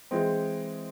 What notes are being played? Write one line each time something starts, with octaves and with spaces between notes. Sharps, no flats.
E3 G#3 C4